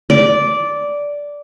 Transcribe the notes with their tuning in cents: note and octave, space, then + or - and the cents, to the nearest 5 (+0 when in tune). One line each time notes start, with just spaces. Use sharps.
D5 -10